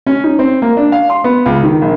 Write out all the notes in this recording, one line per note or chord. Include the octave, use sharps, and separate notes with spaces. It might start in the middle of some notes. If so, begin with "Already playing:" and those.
C#4
D#4
C4
A#3
D4
F5
C6
B3
C#2
D#3
A#1